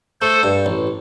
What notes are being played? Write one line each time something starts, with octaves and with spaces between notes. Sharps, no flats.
A3 A4 C5
G2
A1